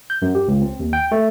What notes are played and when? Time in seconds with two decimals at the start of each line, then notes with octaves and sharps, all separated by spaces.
0.10 G6
0.22 F#2
0.35 G4
0.48 C#2
0.61 C4
0.80 D#2
0.93 G5
1.12 A3